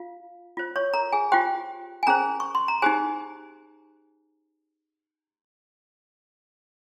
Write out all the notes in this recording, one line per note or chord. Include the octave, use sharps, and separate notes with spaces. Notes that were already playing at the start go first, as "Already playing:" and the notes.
Already playing: F4 F5
F4 C5
C#5 C#6
A#4 A#5
G#4 G#5
F4 G4 C5 G5
G#5
C#4 G#4 A#4 C5 A#5
C#6
C6
A#5
D#4 G4 G#4 C5 G#5